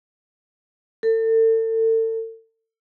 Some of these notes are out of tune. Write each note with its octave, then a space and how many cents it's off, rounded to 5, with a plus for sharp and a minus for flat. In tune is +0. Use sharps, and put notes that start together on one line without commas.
A4 +35